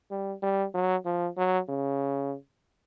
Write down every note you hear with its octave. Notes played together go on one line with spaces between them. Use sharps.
G3
G3
F#3
F3
F#3
C#3